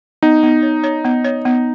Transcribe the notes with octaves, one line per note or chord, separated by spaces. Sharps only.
B3 D#4
B3
C#5
C#5
B3
C#5
B3